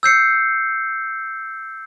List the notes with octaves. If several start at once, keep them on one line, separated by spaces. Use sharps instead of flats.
E6 G6 C7 C#7